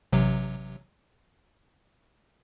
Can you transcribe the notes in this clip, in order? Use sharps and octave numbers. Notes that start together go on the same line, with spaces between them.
A1 C3 F#3